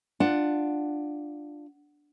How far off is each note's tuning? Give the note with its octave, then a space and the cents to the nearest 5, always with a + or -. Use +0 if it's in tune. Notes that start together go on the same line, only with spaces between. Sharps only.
D4 +10 F4 +0 F#5 +5